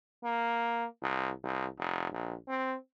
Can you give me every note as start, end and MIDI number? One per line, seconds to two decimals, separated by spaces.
0.24 0.85 58
1.02 1.31 36
1.44 1.66 36
1.79 2.10 29
2.13 2.35 34
2.48 2.76 60